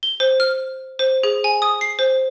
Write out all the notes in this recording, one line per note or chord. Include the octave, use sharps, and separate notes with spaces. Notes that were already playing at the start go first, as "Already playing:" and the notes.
G7
C5
F6
C5
G#4
G#5
D#6
C7
C5